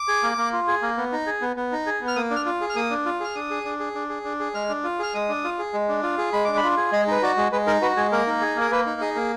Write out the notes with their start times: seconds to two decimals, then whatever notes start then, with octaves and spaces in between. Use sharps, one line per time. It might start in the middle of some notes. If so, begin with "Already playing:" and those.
Already playing: D6
0.08 G#4
0.23 A#3
0.38 A#3
0.53 F4
0.68 G#4
0.82 A#3
0.97 B3
1.12 D#4
1.27 G#4
1.41 B3
1.56 B3
1.72 D#4
1.86 G#4
2.01 B3
2.08 F6
2.16 A#3 D#6
2.31 D4
2.36 F6
2.46 F4
2.61 G#4
2.70 F6
2.75 A#3 D#6
2.91 D4
3.06 F4
3.20 G#4 F6
3.35 D4 D#6
3.50 G#4
3.65 D4
3.80 G#4
3.95 D4
4.09 G#4
4.25 D4
4.40 G#4
4.54 G#3 F6
4.69 D4
4.84 F4
4.99 G#4 F6
5.14 G#3 D#6
5.29 D4
5.44 F4
5.59 G#4
5.74 G#3
5.89 D4
6.03 F4
6.18 G#4
6.33 G#3 B5
6.45 D4 D6
6.57 B5
6.63 F4
6.77 G#4
6.92 G#3 D#5
7.07 D#4 B4
7.22 F#4 D5
7.37 G#3
7.52 G#3 B4
7.67 D#4 A#4
7.82 F#4 B4
7.97 G#3 G#4
8.12 A#3 A#4
8.27 D#4
8.41 G#4
8.56 A#3 A#4
8.71 A#3 B4
8.86 D#4
9.01 G#4 D#5
9.15 A#3